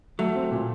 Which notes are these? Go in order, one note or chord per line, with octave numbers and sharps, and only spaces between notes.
F#3 A3
C4
A#2